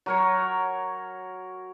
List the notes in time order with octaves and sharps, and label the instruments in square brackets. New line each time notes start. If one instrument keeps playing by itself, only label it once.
[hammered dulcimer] F#3 A#4 C#5